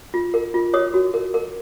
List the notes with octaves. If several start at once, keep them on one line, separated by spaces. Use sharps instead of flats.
F4
A#4
F4
C#5 D#6
F#4
A#4
A#4